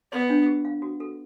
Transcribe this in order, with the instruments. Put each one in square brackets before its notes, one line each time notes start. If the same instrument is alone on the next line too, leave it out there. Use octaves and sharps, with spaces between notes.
[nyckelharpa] B3 [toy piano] D5
[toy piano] D4
G4
F5
F#4
A4